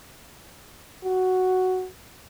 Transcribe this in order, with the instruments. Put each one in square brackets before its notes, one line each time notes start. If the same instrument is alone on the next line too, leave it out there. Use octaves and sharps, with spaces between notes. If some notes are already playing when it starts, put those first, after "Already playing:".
[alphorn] F#4